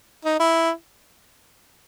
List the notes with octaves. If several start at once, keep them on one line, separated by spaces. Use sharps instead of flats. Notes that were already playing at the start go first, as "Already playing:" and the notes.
D#4
E4